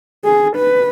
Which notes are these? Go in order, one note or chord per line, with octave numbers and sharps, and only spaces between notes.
G#4
B4